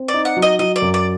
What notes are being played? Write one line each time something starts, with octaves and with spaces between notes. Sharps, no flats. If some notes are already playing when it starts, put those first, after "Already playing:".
Already playing: C4
D5
D#4
F#5
F#3
D#5
F#3 D#5
D5
F#2
D5